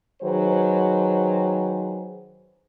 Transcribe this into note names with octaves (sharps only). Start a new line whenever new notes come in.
D#3 F#3 G#4 B4 C5